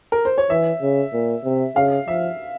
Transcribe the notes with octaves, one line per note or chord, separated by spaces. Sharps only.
A#4
C5
C#5
E3 E5
C#3
A#2
C3
C#3 F5
F3 E5